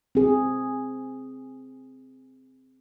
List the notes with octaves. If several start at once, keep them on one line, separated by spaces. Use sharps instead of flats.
C4 G#4